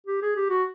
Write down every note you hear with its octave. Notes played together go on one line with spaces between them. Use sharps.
G4
G#4
G4
F#4